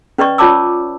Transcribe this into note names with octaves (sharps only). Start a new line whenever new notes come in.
C#4 B4 D5 D#5 C#6
F4 C#5 D5 A5 D6 E6